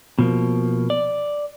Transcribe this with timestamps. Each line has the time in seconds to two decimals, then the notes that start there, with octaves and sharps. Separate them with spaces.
0.19 B2 F3 A#3
0.90 D5